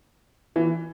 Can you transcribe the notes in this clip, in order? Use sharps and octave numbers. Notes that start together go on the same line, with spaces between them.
E3